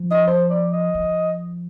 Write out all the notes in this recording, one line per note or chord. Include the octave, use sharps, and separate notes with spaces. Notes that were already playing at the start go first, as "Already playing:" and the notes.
Already playing: F3
D#5
C5
D5
D#5
F3